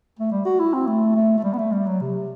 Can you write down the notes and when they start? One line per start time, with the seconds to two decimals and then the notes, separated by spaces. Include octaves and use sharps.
0.19 A3
0.32 G3
0.45 F#4
0.60 E4
0.74 C4
0.87 A3
1.16 A3
1.38 A3
1.44 G3
1.53 B3
1.59 A3
1.72 G3
1.87 F#3
2.01 C3